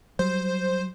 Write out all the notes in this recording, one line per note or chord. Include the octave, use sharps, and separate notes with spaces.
F#3 G3 C5